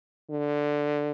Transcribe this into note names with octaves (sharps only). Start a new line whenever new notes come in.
D3